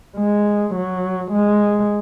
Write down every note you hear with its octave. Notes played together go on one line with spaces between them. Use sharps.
G#3
F#3
G#3